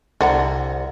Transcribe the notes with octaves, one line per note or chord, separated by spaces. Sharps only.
C2 D3 F#5 A#5